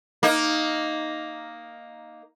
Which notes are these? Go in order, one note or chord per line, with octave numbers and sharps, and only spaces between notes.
A#3 D#4